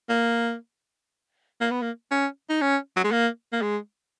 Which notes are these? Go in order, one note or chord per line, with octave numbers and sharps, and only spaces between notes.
A#3
A#3
B3
A#3
C#4
D#4
C#4
F#3
G#3
A#3
A#3
G#3